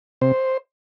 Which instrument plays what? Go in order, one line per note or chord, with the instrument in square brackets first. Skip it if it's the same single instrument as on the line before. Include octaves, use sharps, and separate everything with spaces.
[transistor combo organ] C3 C5